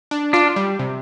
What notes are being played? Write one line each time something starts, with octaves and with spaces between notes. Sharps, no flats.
D4
D4 F4
G3
C3